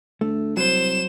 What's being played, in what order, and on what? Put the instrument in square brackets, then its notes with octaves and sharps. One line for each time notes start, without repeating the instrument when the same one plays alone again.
[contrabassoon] D2 [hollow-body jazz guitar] A3
[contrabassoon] C2 [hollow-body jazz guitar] F#3 [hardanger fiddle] C5 [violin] E7